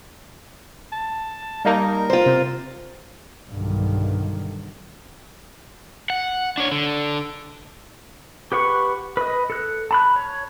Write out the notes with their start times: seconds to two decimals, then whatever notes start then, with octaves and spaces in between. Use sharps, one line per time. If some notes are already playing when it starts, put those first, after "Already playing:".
0.92 A5
1.65 G3 A#3 D#4 A#4
2.10 F4 C5
2.26 C3
3.50 B1 G2 D3 D#3
6.10 F#5
6.58 D4 C#5
6.72 D3
8.52 G4 B4 F#5 C#6
9.17 B4 D#5
9.50 A4 F#6
9.91 A5 B5 F#6
10.16 C#5